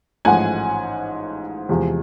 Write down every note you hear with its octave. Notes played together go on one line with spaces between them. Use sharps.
A1 G#2 F3 A3 F#5 G#5
E2 C3 F3 G#3